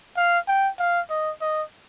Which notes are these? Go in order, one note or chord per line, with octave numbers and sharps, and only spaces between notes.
F5
G5
F5
D#5
D#5